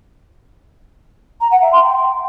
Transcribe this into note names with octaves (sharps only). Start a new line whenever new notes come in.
A#5
F#5
E5
C6
G5